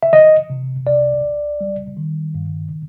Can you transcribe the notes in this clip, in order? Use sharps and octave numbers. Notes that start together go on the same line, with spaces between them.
E5
E3 D#5
C3
C2 D5
C2
G3
D#3
G2